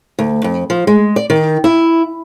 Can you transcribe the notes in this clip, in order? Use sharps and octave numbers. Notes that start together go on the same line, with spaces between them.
D2
F2
F3
G#3
D5
D#3
E4